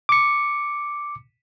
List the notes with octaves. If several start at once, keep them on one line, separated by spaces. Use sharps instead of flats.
D6 C#7